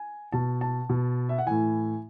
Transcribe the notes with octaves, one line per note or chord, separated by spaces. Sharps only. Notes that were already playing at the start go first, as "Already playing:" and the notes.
Already playing: G#5
B2 A5
A5
B2
E5
F#5
A2 E3 G#5